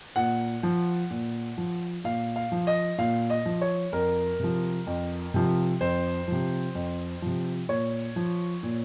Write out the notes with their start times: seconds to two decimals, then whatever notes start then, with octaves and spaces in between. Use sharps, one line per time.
0.16 A#2 F#5
0.63 F3
1.11 A#2
1.58 F3
2.04 A#2 F5
2.36 F5
2.52 F3
2.67 D#5
2.98 A#2 F5
3.30 D#5
3.46 F3
3.61 C#5
3.92 F2 A#4
4.40 C3 F3
4.87 F2
5.34 C3 F3
5.81 F2 C5
6.28 C3 F3
6.75 F2
7.22 C3 F3
7.69 A#2 C#5
8.16 F3
8.63 A#2